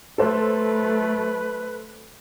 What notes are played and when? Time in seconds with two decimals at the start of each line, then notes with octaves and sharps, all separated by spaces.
0.18 F#3 A3 A4 B4 C5